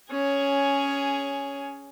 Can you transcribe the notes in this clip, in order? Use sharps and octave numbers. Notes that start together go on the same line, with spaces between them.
C#4 G#4 C#5